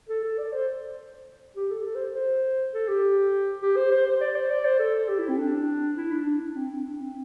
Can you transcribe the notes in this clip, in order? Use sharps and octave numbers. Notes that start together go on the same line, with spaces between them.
A4
A4
D5
C5
G4
A4
A4
C5
C5
A4
G4
G4
C5
C5
C5
D5
C5
D5
C5
A4
G4
E4
C4
D4
E4
D4
D4
D4
C4
D4
C4